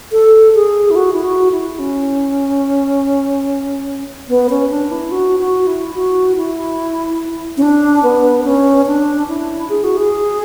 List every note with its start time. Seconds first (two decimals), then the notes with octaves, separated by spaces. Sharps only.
0.12 A4
0.55 G#4
0.91 E4
0.96 F#4
1.13 E4
1.24 F#4
1.52 E4
1.79 C#4
4.28 B3
4.50 C#4
4.70 D4
4.91 E4
5.11 F#4
5.39 F#4
5.67 E4
5.95 F#4
6.36 E4
7.57 C#4
7.62 D4
8.03 B3
8.44 C#4
8.86 D4
9.28 E4
9.70 G#4
9.84 F#4
9.97 G#4